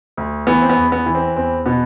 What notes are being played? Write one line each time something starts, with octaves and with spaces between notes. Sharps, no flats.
D2
E3 B3
C4
B3
E2
B3
E3
C4
E2 C4
B2 B3